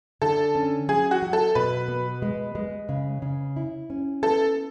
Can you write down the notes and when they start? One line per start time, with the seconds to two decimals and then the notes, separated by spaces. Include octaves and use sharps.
0.22 D3 A4
0.55 C#4
0.88 F#3 G#4
1.11 F#4
1.22 F#3
1.33 A4
1.55 B2 B4
1.88 B3
2.22 G#3
2.55 G#3
2.89 C#3
3.22 C#3
3.56 E4
3.90 C#4
4.23 B3 A4